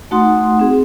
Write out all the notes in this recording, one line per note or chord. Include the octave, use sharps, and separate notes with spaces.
A3 D#4 F#4 F#5 C6 D#6
C4 G#4